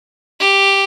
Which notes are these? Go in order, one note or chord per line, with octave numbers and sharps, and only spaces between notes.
G4